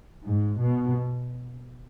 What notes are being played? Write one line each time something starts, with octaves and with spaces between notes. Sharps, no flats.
G#2
B2